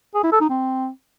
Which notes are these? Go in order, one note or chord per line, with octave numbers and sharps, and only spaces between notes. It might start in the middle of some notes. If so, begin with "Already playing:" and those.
G#4
E4
A4
D#4
C4